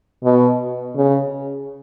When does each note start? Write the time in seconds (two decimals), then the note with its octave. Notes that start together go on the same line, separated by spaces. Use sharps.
0.24 B2
0.96 C#3